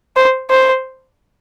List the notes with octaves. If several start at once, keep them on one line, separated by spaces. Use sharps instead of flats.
C5
C5